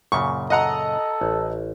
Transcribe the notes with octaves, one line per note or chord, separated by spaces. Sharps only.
F#2 A#2 C#3 C#6
A4 D#5 F#5 A#5
A1